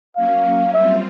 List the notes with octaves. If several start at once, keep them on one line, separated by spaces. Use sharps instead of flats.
F#3 A#3 C#4 F5
G3 C4 F4 E5